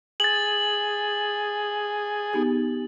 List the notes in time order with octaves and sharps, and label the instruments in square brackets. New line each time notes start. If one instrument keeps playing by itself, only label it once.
[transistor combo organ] G#4 [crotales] A6 F#7
[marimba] B3 D#4 G4